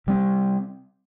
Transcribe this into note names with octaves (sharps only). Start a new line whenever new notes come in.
C3 G3 C4